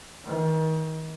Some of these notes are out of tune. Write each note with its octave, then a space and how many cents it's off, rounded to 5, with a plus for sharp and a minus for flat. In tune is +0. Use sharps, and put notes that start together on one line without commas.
D#3 +35